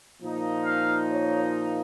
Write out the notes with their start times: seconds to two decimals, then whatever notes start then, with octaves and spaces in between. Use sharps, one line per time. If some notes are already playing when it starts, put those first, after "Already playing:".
0.21 A#2 F3 A#3 D#4
0.66 F5
1.10 C#5